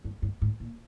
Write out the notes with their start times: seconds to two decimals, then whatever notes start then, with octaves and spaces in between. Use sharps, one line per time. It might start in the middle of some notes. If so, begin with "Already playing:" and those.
0.05 G2
0.22 G2
0.42 G#2
0.60 A#2